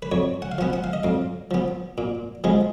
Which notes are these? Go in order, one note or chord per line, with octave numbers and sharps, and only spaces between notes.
B4
F2 C#5
F#5
F5
F3 B3 F#5
F#5
F5
D#5
F2 F5
F3 B3
A#2
F3 G#3 B3